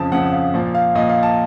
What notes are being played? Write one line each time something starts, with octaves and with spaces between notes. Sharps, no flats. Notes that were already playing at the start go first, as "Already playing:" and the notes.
Already playing: F2 C#3 F3 A5
F2 C#3 F3 F#5
F5
A#2 F3
F5
A#2 F3 D#5
F5
A5